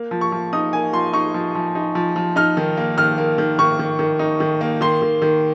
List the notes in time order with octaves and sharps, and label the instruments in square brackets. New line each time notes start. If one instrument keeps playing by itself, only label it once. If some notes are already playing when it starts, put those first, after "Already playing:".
Already playing: [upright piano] A#3
F3
C#6
F3
D#4 D#6
A#3 G#5
F3 C6
D#4 C#6
F3
F3
D#4
F3
F3
D#4 F6
D#3
A#3
D#3 F6
A#3
D#3
D#3 C#6
D#3
D#3
D#4
D#3
A#3
D#3 C6
D#3
D#3